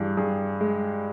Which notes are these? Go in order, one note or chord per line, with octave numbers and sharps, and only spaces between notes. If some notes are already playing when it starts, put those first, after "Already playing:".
Already playing: G2 E3 G#4
G2 G#4
G#3